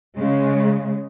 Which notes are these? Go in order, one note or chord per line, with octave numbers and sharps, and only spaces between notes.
C#3 G#3